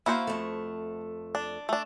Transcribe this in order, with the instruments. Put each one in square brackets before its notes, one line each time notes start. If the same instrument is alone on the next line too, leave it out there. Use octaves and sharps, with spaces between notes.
[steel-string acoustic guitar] A#3 F5 [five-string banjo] E4 F#4 C5
[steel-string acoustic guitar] F2 A3
[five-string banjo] D4
A3 D4